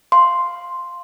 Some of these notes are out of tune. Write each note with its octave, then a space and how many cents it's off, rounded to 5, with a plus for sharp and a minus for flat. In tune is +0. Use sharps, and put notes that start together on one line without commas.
F5 +0 C6 +0